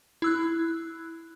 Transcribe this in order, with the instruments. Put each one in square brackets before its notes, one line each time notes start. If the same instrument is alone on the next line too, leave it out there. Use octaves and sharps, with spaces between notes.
[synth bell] E4 E6 F#6